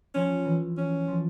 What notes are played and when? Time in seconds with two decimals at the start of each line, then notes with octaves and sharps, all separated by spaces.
0.15 F3 C#4
0.45 E3
0.77 C#4
1.08 F3